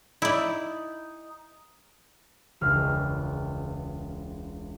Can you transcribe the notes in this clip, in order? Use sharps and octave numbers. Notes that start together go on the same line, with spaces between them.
D#4 E4 D5
E1 C#2 F6